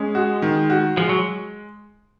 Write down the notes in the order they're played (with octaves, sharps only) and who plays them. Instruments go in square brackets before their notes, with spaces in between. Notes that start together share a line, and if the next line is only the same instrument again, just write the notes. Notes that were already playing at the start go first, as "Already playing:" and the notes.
Already playing: [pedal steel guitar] G#3 [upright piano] C#4
[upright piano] F#4
D#3
F#4
[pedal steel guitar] F3 [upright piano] G#3
[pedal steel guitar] F#3